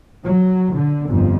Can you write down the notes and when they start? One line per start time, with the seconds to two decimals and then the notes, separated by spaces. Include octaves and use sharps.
0.24 F#3
0.75 D3
1.09 G1 F2